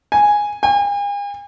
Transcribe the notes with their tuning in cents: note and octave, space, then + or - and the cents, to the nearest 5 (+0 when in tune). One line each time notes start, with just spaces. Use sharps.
G#5 -5
G#5 -45